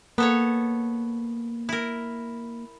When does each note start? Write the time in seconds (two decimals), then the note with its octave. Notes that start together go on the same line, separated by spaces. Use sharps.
0.18 A#3 B3 A4 C#5
1.69 E4 A#4